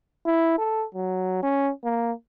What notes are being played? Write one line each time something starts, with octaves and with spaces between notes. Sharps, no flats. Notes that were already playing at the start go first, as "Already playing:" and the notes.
E4
A4
F#3
C#4
A#3